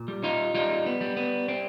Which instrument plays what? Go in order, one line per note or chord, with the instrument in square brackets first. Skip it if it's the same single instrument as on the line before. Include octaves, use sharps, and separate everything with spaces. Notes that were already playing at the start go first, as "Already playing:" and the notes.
Already playing: [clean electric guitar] A#2
G3
D#4 F4
G3 D#4 F4
B3
G3
B3
C4